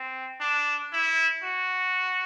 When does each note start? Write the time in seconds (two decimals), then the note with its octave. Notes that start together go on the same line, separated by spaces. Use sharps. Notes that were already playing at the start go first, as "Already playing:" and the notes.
Already playing: C4
0.40 D4
0.92 E4
1.44 F#4